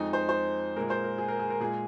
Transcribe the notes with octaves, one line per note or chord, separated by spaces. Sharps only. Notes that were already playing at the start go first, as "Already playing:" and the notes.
Already playing: F2 F3 G#3 D#4
C5
C5
A#2 G#3 A#4
C5
A#4
G#4
A#4
G#4
A#4
A#2 G#3 G#4